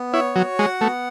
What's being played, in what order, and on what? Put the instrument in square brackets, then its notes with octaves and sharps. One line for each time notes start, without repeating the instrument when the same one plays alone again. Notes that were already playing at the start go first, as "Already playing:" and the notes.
Already playing: [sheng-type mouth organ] B3
[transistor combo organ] E4 [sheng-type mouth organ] C#5
[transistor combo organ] F#3 [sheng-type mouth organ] F#4
[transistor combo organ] G#3 [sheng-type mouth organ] F#5
[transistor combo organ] A3 [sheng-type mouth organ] B3